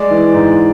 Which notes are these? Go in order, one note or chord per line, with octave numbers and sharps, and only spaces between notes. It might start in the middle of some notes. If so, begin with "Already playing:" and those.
Already playing: G#3 D5 D6
E3
G#2